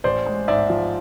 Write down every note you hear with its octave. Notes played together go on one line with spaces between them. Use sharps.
A1 C5 D5
G#3
G#2 D5 E5
F3